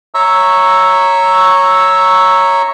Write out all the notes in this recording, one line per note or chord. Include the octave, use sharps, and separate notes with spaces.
C#5 E5 A#5 C#6 E6